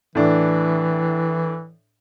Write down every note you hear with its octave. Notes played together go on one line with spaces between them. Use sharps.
A2 E3 D4